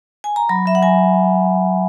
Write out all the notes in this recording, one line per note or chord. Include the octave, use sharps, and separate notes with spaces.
G#5
A#5
F#3 B5
F#3 E5
F#5
F#3 G#5